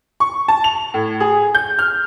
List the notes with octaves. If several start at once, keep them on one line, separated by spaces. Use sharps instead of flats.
C#6
A5
F7
A2
G#4
G6
F6